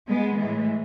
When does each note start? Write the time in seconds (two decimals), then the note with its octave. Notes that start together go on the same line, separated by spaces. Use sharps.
0.09 G#3 B3
0.38 A2 E3 G#3